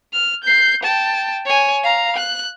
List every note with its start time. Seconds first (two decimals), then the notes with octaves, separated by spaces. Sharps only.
0.13 F6
0.44 G6 C7
0.83 G5 A5
1.45 C#5 G#5
1.84 F5 A#5
2.16 F#6